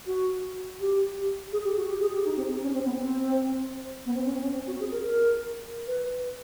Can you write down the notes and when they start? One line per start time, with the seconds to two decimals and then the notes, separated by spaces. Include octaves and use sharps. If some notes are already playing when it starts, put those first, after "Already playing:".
0.07 F#4
0.80 G4
1.53 G#4
1.64 G4
1.77 F#4
1.88 G4
2.01 G#4
2.13 G4
2.25 D#4
2.36 C4
2.62 C#4
2.74 C4
2.85 B3
2.98 C4
4.06 B3
4.15 C4
4.25 C#4
4.34 C4
4.42 C#4
4.54 C4
4.67 F#4
4.80 G#4
4.91 A#4
5.03 A#4
5.87 B4